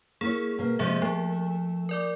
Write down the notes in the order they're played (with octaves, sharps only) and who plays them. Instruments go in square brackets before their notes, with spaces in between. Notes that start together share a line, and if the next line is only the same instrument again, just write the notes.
[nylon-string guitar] A#3 E4 C#5 [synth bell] G#4
[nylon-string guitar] B2 A#3
[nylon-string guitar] C3 F3 G#3 [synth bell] A#3 G#4 E5
[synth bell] F3 [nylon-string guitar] A3
[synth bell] A#4 D5 D6